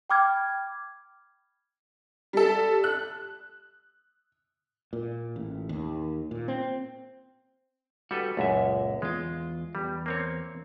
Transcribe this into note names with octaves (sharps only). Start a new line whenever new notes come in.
G5 B5 D6 F6 G#6
G3 A4
F#6
A#2
A1
D#2
A#2
C4
G3 F#4 A4 B4
C#2 F#2 A#2 G#3 E5
E2 G#3 F4
E2 G3
A#3 C4 C#5